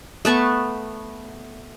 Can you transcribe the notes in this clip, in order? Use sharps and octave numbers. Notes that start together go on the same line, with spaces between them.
A3 B3 A5 C#6